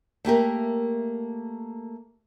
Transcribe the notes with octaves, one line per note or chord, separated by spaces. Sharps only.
A3 A#3 G4 A#4